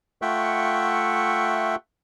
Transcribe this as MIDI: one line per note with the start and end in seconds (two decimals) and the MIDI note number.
0.22 1.76 57
0.22 1.76 65
0.22 1.76 76
0.22 1.76 78
0.22 1.76 79
0.22 1.76 85